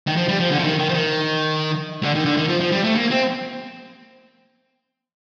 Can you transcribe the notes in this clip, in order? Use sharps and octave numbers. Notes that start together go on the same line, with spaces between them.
D#3
F3
G3
F3
D3
F3
D#3
D#3
F3
D#3
D3
D#3
D3
D#3
F3
F3
G3
A3
A#3
C4